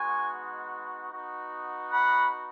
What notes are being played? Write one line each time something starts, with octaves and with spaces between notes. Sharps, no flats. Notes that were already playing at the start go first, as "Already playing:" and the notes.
Already playing: G#3 B3 D#4 F#4 G#5 C#6
B3 D#4 F#4
F#5 B5